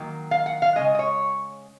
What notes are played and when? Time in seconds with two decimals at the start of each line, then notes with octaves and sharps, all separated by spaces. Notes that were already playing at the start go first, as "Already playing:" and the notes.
Already playing: D#3 F#3 A#3
0.31 F5
0.46 F#5
0.62 F5
0.76 G#3 D#5
0.79 C#3
0.95 D#5
0.99 C#5